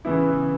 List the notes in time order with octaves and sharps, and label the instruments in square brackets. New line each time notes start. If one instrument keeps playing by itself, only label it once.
[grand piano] C#3 E3 B3 E4